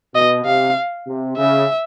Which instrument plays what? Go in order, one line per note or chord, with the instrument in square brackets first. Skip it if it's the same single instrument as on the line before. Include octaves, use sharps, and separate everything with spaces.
[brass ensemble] B2 [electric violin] D#5
[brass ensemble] C3 [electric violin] F5
[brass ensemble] C3
[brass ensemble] C#3 [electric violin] E5